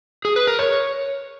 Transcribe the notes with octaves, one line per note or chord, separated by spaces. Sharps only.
G#4
B4
A#4
C#5